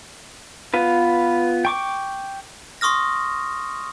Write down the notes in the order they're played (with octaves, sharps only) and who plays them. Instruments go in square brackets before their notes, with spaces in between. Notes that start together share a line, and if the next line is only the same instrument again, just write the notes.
[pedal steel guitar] B3 F4 B4
G5 C#6 D6
[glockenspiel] C6 C#6 D#6 F6 A#6